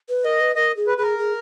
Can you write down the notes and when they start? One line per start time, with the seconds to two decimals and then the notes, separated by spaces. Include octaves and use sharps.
0.09 B4
0.25 A#4 D#5
0.40 B4
0.56 A#4 D#5
0.77 G#4
0.87 B4
0.98 G#4 B4
1.03 A#4
1.18 G#4